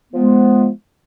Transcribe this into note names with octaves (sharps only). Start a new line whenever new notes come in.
F3 G#3 B3